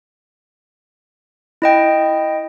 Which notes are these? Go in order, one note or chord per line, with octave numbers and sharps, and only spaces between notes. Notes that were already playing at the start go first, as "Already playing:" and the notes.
E4 D#5 G5